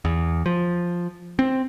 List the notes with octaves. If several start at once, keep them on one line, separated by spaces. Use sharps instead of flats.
E2
F3
C4